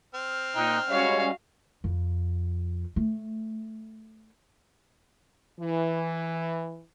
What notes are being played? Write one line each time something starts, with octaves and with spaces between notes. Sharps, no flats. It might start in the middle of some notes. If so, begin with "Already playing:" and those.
C4 F6
A#2 D#4 G5 F#6
G3 G#3 C#4 F#4 C#5 F5
F2
A3
E3